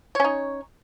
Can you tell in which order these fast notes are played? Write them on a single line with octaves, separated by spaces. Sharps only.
C#5 C#4 D#4